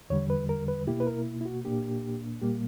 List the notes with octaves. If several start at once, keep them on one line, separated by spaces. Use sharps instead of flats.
E2 D3 G3 C#5
B4
A#4
B4
B2 A#3 E4 G4
B4
A#4
E4
F#4
A#2 A#3 D4 G4
A#2 G3 A#3 G4